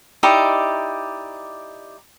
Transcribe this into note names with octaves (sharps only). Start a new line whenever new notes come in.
D#4 E4 G4 D5